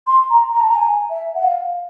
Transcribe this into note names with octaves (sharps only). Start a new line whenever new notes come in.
C6
A#5
A#5
A5
A#5
G#5
E5
F#5
F5